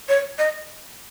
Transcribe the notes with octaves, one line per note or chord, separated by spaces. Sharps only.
C#5
D#5